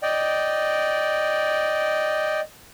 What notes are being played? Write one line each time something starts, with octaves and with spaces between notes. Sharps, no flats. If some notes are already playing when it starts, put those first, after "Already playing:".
D5 D#5 G5